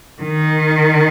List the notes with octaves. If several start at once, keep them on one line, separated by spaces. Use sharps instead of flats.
D#3